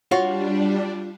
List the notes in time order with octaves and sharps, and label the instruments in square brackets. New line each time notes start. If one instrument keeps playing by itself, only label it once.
[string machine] G3 D4 [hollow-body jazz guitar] F4 F#4 C#5